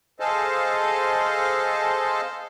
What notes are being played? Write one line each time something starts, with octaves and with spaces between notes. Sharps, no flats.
G#4 A4 C5 D#5 F5 A5